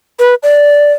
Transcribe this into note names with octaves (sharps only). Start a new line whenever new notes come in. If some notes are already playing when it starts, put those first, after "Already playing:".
B4
D5